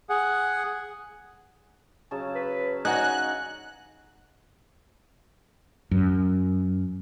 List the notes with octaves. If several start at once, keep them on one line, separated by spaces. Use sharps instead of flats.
G#4 F#5
C#3 F#3 A5
B4
D#4 F#4 G#5 F#6
F#2